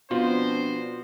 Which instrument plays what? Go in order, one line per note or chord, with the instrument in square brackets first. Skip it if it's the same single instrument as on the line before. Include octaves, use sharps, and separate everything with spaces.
[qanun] B2 [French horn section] F3 C4 D4 [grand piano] F4 [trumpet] C5